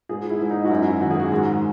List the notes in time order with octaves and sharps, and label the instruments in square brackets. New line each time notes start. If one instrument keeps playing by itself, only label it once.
[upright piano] G#2 G#4
E4
G#2
D#4
F#4
F#2 E4
D#3 F#4
G#4
F#4
G#2